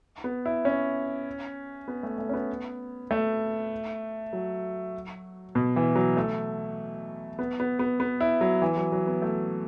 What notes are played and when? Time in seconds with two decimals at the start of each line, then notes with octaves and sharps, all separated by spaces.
0.24 B3
0.46 E4
0.65 C#4
1.88 B3
2.03 A3
2.18 A3
2.29 C#4
2.33 B3
3.11 A3
4.33 F#3
5.55 B2
5.76 E3
5.96 F#3
6.17 A3
7.39 B3
7.60 B3
7.79 B3
8.00 B3
8.21 E4
8.41 F#3
8.62 E3
8.77 F#3
8.92 F#3
9.07 B3
9.22 A3